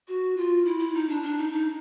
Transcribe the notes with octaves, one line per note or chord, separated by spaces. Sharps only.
F#4
F4
E4
E4
D#4
D4
D4
D#4
D#4